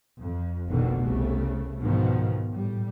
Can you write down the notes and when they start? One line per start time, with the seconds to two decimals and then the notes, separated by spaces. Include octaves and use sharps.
0.20 F2
0.68 F1 A#1 B2 D3 D#3
1.00 C2 C#3 A3
1.81 G#2 B2 D#3 F3
2.52 A2 G3